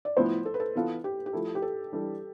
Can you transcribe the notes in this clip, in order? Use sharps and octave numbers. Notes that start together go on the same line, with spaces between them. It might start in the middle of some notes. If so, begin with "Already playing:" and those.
D5
A2 F3 B3 E4 C5
A4
B4
A4
E3 B3 F4 A4
G4
G4
F3 A3 E4 A4
G4
A4
E3 G3 D4 A4